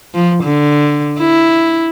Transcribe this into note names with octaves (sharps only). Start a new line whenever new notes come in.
F3
D3
E4